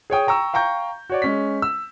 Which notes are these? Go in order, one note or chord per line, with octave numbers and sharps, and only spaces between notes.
G#4 C#5 G5 D#6
G5 A#5 C#6 E6
F5 G5 A#5 C#6 G6
F#4 C#5 D5
G#3 C#4 B6
E6